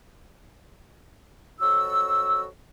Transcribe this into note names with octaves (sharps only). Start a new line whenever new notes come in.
F2 F#3 F#4 E6